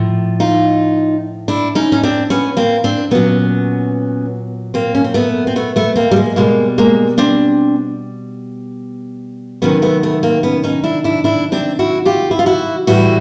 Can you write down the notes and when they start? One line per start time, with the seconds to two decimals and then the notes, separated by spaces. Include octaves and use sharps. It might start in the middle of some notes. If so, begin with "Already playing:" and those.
Already playing: A2 F3
0.40 D#4 F4
1.48 D4 E4
1.75 C#4 D#4
1.92 C#4
2.03 C4 D4
2.30 B3 C#4
2.57 A#3 C4
2.84 C4 D4
3.11 A#2 F#3 B3 C#4
4.74 A#3 C4
4.95 C#4
5.04 C4
5.14 A3 B3
5.47 C4
5.56 A3 B3
5.76 A3 B3
5.96 A#3 C4
6.11 G3
6.16 G#3
6.36 B2 G3 G#3 A#3
6.78 G#3 A#3
7.18 C4 D4
9.62 C3 D#3 F#3 B3 C#4
9.82 A3 B3
10.03 A3 B3
10.23 A#3 C4
10.43 B3 C#4
10.64 C#4 D#4
10.84 D4 E4
11.04 D4 E4
11.24 D4 E4
11.52 C4 D4
11.79 E4 F#4
12.05 F4 G4
12.31 E4
12.39 F4
12.46 E4 F#4
12.87 A2 E3 G3 E4 F#4